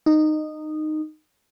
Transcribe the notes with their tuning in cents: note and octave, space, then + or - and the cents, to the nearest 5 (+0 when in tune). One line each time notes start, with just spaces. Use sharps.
D#4 -15